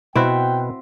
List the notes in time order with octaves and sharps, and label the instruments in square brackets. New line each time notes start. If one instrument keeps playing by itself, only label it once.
[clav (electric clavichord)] B2 B4 [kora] C4 E4 F#4 [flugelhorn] G5